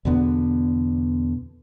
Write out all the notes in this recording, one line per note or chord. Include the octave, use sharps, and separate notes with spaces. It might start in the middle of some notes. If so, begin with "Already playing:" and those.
E2 B2 D3 B3